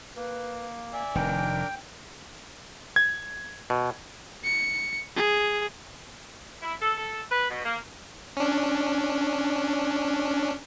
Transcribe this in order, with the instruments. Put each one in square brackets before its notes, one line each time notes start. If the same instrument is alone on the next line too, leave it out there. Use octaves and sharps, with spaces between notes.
[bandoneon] A#3 [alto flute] B4
[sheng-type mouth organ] D5 E5 [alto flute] G#5
[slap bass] F1 D#3 [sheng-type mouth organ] D4 A#4 D6 [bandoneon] G5
[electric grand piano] G#6
[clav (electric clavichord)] B2
[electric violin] C#7
G#4
[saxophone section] E4
A4
A4
B4
B2
A#3
[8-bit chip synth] C#4 D4